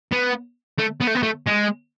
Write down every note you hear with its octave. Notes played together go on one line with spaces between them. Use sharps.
B3
A3
B3
A3
B3
A3
G#3